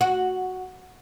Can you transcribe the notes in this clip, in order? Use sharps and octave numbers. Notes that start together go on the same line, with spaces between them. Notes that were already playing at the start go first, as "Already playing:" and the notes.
F#4